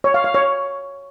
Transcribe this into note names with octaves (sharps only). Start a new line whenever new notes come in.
C#5
F5
F5
C#5